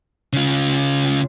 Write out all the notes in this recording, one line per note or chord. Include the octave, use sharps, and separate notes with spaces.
C#3 F4